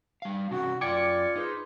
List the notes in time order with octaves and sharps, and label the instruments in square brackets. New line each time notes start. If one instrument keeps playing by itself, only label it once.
[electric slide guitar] G3 F5
[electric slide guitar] C3 C#4 D#4 [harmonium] F#4
[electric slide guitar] F#2 G5 [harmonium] F4 [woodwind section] D5 [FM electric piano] D6 G#6 C#7
[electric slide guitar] D#4 [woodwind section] G#4 B4 C5